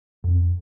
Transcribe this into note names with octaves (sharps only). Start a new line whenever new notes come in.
F2